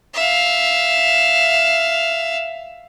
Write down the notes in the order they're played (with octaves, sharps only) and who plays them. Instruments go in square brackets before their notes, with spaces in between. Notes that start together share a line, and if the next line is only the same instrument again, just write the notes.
[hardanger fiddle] E5 F5